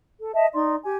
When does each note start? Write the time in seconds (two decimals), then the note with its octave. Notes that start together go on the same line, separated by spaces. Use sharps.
0.19 A4
0.34 D#5 E5 A5
0.53 D#4 D5 C6
0.83 G4 G#5